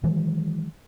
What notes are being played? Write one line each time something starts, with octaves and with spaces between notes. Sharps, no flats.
D#3 E3 F#3 G#3